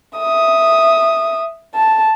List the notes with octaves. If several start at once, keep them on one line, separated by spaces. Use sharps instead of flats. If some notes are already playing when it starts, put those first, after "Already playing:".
E5 D#6
A5